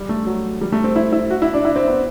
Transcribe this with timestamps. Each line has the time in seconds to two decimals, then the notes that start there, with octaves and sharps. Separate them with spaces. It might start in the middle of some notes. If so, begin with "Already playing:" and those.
Already playing: G3
0.09 A3
0.26 F#3
0.61 G3
0.72 A3
0.84 C4
0.96 E4
1.12 E4
1.30 F#4
1.42 E4
1.53 D4
1.65 E4
1.76 C4
1.87 B3